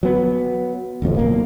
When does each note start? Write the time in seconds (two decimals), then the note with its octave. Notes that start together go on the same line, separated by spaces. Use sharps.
0.03 F#3 B3
1.02 D1 A1 F2 A2
1.17 B1 E2 A#3